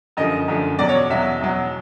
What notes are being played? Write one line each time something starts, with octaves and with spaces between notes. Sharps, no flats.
F#2 D3 F3 A3 D#5
F#2 D3 F3 A3
E2 B2 F#3 D5
C#5
E2 B2 F#3 E5
E2 B2 F#3